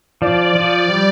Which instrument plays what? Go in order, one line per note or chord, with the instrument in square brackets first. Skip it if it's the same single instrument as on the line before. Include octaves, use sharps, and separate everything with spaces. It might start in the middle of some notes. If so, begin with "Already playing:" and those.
[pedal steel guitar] F3 [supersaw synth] D5
[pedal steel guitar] F3
G3